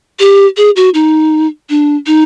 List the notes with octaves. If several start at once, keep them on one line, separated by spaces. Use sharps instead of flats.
G4
G#4
F#4
D#4
D4
D#4